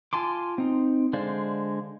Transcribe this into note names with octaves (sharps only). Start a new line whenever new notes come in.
F4 G#5 A5 C6 D6
C4 D#4
D3 G#3 C5 D5 F5